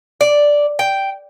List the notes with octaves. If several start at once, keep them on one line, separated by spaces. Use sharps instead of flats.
D5
G5